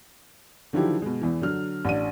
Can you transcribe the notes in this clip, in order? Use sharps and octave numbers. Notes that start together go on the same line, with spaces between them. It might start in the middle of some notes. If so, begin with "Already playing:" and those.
D3 D#3 F3 F#3 E4 G4
B2 G#3
E2 E3
D3 F#3 F6
A1 D4 D#7